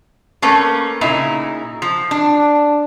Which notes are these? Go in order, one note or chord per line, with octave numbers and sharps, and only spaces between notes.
A3 A#3 C#4 B4
A#2 C#3 D#4 E4
F3
D4